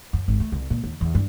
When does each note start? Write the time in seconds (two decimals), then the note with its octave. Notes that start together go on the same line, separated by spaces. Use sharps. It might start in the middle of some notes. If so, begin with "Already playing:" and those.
0.13 F#2
0.28 G#1
0.40 A3
0.52 C2
0.70 A#2
0.83 D#2
1.01 E2
1.15 G2